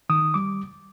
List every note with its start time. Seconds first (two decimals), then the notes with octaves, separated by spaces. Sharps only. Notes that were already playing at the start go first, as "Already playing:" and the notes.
0.10 D#3 D#6
0.34 G3 D6